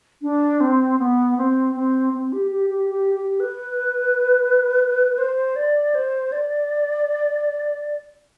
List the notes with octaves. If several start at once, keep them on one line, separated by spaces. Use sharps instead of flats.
D4
C4
B3
C4
C4
C4
G4
G4
G4
G4
G4
B4
C5
D5
C5
D5